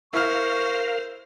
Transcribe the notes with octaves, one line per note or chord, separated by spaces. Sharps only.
E4 A#4 C5 F5 C#6 F6